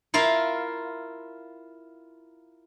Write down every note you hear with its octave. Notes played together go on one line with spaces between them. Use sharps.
E4 F4 A#4 E5 F5